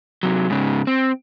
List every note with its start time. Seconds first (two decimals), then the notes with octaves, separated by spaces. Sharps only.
0.23 C3 F#3
0.50 G#2 C#3
0.87 C4